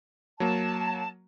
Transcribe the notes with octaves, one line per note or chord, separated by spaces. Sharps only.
F#3 A#3 A5